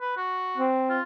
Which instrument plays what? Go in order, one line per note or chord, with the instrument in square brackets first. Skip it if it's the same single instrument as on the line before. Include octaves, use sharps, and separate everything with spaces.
[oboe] B4
F#4
[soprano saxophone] C4
[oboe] F4